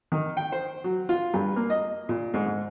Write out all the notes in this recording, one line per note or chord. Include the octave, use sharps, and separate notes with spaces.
D#3
G5
C5
F#3
F4
G2
A#3
D#5
A#2
G#2
G#2